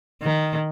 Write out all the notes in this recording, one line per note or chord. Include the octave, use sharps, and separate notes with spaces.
D#3